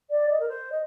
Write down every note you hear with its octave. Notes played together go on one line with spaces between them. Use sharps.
D5
D#5
A#4
C5
D#5